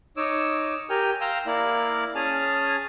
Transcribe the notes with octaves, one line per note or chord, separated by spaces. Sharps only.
D#4 C#5 D6 E6
G4 A#4 G5 G#5 F6
F5 G5 A#5 C6 E6
A#3 E4 D5 F5
C#4 G#4 G#5 A5 F6